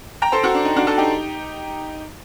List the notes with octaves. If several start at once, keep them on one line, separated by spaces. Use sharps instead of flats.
G5 A#5
A4 C5
F#4 A4
D4
D#4
D4 F#4
F#4 A4
D#4 G4